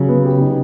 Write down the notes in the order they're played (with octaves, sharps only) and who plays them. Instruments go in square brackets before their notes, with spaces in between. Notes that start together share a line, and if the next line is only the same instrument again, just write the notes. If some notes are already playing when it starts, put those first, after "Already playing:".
Already playing: [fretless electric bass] C#3 [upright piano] F#3
[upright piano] B3
G4
D#4